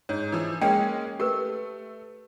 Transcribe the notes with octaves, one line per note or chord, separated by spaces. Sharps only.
G#2 C#5
E3 F3
G#3 A#3 C#4 G5
A3 G4 A#4 B4